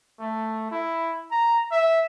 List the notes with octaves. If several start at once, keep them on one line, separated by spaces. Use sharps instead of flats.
A3
E4
A#5
E5